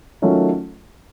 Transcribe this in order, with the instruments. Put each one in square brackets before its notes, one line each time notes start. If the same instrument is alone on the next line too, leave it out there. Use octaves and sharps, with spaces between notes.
[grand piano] D#3 F#3 A3 C#4 F4